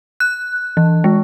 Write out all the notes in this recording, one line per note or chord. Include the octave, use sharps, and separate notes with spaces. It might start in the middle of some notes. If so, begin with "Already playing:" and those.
F#6
E3
G#3